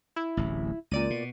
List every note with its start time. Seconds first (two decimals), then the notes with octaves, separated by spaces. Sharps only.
0.16 E4
0.37 D1 A1
0.91 C#2 A#2 D5 D#7
1.10 B2